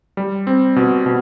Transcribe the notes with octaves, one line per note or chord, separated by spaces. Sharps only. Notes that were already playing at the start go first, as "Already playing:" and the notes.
G3
C4
B2
B2